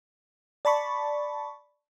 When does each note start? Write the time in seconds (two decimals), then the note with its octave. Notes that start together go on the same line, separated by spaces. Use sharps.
0.65 D5 A5 B5 C#6